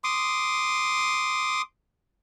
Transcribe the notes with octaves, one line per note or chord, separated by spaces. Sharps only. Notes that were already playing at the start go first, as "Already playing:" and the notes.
C6 D6 D#6